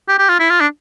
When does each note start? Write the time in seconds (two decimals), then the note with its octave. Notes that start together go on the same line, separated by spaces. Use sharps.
0.08 G4
0.18 G4
0.29 F4
0.39 E4
0.50 F4
0.60 D4